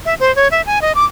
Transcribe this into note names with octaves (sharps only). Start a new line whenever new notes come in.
E5
C5
C#5
E5
G#5
D#5
D6